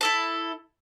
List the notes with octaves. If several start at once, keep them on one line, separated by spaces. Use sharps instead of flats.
E4 A4 A5